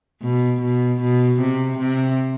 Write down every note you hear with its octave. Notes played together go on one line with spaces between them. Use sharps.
B2
B2
B2
C3
C3